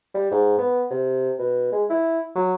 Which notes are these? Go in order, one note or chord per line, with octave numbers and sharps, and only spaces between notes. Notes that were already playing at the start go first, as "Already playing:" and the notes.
G3
G#2
B3
C3
B2
G#3
E4
F#3